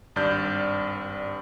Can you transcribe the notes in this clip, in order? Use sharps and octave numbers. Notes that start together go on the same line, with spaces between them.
G#1 G2 D5 F6 G6